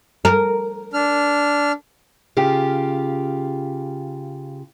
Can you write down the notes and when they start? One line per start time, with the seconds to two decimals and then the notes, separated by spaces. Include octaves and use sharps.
0.25 A#4
0.93 D4 F6
2.37 C#3 F4 G4